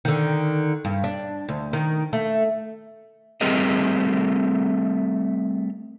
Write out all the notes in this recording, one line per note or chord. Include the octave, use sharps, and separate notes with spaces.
D3 D#3
G2
D4
D2
D#3
A3
G3 A3 C4 G#4 A#4 D#5